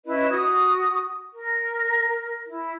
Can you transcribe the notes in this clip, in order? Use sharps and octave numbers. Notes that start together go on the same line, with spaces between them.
C#4 E4 B4 D#5
F#4 D#6
A#4
E4